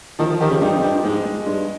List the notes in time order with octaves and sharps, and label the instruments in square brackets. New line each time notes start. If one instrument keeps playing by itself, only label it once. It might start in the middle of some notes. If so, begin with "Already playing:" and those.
[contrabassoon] D#3 [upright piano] F3
[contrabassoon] D#3
[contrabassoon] D#3 [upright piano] G4
[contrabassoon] C#3
[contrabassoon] G2 [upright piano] D#4
[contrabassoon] F2
[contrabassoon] G2 [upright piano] G4
[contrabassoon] G#2 [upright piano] G#3
[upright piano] G#3
[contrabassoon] G2 [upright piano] G#3